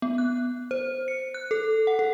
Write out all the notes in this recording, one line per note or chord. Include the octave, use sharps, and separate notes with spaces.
B3
F#6
C5
C#7
F#6
A4
F#5
A4